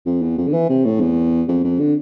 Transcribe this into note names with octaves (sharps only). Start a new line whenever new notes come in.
F2
E2
F2
D3
E3
C3
A2
E2
F2
F2
D3